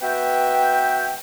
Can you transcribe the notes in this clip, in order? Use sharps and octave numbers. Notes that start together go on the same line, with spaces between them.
B3 F#4 B4 E5 G5